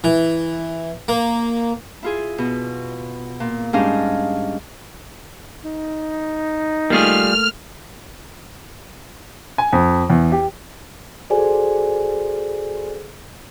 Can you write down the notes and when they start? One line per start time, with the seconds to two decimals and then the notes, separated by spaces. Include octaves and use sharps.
0.04 E3
1.08 A#3
2.03 E4 F4 G#4
2.38 B2
3.40 A#2
3.73 G#2 G3 C#4 D4 D#5 F5
5.65 D#4
6.90 G3 A3 A#3 F4 G#4 F6
9.58 G#5
9.73 F2
10.10 E2
10.32 G4
11.30 F#4 G#4 A4 C5 D5 G#5